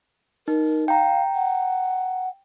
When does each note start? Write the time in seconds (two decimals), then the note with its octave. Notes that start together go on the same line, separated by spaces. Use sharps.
0.48 D#4 A#4
0.88 F5 G5 A#5
1.35 F#5